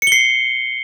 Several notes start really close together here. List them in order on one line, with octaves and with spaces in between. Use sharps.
C#7 G7 C7